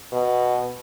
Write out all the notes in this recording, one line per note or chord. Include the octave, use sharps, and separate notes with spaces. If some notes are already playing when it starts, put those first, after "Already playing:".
B2